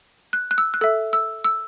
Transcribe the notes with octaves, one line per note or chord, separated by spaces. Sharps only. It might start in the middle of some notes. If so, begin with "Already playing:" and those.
F#6
F#6
E6
F#6
A4 E5 E6
E6
E6